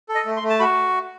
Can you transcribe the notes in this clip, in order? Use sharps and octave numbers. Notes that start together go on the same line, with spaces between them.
A4
D#5
A3
C6
A3
A5
F#4 B5